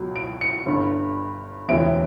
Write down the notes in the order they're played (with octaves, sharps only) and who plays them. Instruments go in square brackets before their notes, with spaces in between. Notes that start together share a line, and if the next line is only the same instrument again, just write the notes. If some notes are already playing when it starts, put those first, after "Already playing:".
Already playing: [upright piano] C#2 B2 F#3
D7
C#7
G1 G2 D3
E1 D2 C3 E3 D7